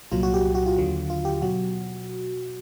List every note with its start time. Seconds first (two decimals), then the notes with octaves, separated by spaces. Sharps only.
0.12 C2 A#2 F#3 F4
0.23 F#4
0.34 G4
0.55 F#4
0.66 F4
0.77 D#2 D3 F#3
1.10 F4
1.25 G4
1.42 B2 F#3 F#4